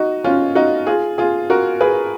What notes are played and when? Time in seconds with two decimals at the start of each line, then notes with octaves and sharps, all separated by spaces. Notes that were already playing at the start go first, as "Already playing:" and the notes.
Already playing: D#4 F#4
0.24 C#4 F4
0.55 D#4 F#4
0.87 F4 G#4
1.18 F4 G#4
1.50 F#4 A#4
1.80 G#4 B4